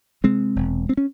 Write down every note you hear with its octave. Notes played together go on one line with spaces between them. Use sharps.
C3 G#3 C4
E1
C4
C#4